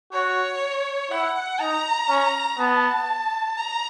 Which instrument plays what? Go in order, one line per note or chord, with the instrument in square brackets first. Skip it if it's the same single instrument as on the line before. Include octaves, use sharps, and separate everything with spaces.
[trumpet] F#4 [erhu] C#5
[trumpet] E4 [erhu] F#5
[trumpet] D#4 [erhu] A#5
[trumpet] C#4
[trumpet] B3 [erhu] A5
[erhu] A#5